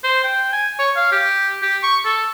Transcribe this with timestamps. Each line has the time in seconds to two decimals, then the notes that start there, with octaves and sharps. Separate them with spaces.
0.04 C5
0.24 G5
0.53 G#5
0.79 C#5
0.96 F5
1.12 G4
1.62 G4
1.83 C#6
2.05 A4